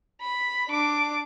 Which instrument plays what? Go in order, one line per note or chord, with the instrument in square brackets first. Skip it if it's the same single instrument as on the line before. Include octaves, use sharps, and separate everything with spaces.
[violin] B5
D4 D6